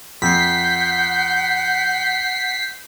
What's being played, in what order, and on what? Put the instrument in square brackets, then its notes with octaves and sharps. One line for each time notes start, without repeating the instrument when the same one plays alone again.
[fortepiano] F2 [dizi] F#5 [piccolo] G6 [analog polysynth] B6 C7